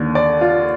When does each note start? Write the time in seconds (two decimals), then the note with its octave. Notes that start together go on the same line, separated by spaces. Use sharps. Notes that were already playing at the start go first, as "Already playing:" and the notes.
Already playing: D#2 D3
0.15 D5
0.41 F4